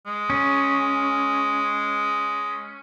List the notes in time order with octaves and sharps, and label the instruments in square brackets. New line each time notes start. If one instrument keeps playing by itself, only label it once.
[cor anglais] G#3
[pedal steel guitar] C#4